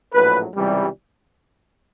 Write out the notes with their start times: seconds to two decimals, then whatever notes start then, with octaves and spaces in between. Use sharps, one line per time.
0.13 A#1 A2 F#3 B4
0.55 C#2 C3 E3 G3